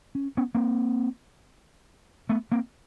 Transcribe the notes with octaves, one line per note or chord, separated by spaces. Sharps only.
C#4
B3 C#4
A#3 C4
A3 B3
A#3 C4